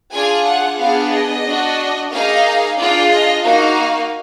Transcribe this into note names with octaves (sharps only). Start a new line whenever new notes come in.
D4 F4 G#4 G#5
F#5
B3 D4 G#4 F5
D#5
D4 F#4
A#3 D#4 G#4 F5
D4 F4 G#4 D5
D#5
A#3 D#4 F#4 F5